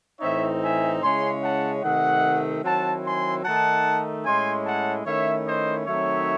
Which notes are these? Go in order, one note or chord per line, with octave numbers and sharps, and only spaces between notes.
A2 E3 C4 D#4 C#5 E5
E5 G#5
C#3 G#3 C#4 E4 G#5 C6
F#5 A5
C3 D#3 A3 D#5 F#5
D#3 F#3 C4 E4 F#5 A5
G#5 C6
D#3 A3 D#4 F#5 A5
A2 G#3 C#4 E4 G#5 C6
F#5 A5
D#3 A3 C#4 E4 C#5 E5
C5 D#5
D#3 F#3 A3 C4 D#4 C#5 E5